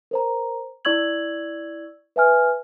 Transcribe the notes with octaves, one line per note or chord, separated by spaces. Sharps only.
A#4 C5 A#5
E4 D5 C#6 E6 G#6 F#7
B4 E5 G#5 F6